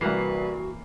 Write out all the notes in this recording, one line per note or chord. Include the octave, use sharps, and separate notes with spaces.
C2 E3 A#3 F#4 B4 F#5 C7